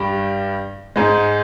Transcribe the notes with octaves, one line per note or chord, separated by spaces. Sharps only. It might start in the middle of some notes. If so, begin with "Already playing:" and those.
Already playing: G2 G3
G#2 G#3